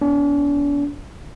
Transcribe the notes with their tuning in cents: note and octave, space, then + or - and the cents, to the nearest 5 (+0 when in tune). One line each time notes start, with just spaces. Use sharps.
B3 +0 D4 -40